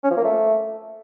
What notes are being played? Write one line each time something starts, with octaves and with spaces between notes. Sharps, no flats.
C#4
F3
A#3
A3